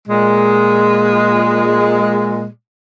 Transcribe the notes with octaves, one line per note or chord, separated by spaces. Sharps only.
A#2 G#3